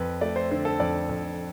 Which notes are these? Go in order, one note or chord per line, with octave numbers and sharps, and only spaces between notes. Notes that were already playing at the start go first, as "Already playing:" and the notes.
Already playing: F2 B4
A3 D5
C5
D3 C5
A4
F2 D5
F2